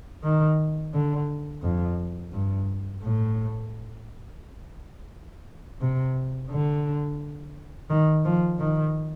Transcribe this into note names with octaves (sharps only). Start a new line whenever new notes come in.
D#3
D3
F2
G2
A2
C3
D3
D#3
F3
D#3